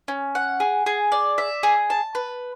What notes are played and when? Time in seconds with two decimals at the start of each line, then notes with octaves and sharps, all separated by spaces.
0.08 C#4
0.35 F#5
0.60 G#4
0.86 G#4
1.12 D5
1.38 E5
1.63 G#4
1.90 A5
2.15 B4